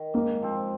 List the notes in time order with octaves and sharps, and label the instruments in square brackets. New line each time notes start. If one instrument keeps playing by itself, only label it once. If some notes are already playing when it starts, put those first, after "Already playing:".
Already playing: [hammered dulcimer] D#3
[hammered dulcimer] G#2 [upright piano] A#3
[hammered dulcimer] F3 C4